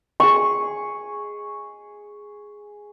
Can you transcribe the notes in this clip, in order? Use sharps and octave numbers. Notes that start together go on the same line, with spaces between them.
G#4 C#6